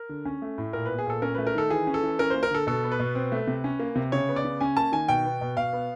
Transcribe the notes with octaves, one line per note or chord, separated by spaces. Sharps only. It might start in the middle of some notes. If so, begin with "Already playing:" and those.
Already playing: A#4
D3
C#4
A3
A2
A#2 A#4
B3 B4
G#4
A#2 A4
C#4 A#4
A3 B4
A#4
D#3 A4
E3 G#4
C#4
A4
E3
C#4 A#4
A#3 C5
A#4
D3 A4
B2 A4
B3
B4
B2
C4
A3
C3
C#4
A#3
C3
C#3 C#5
B3
D5
C#3
C#4 G#5
A#3 A5
D#3 G#5
B2 G5
B3
B2
B2 F5
B3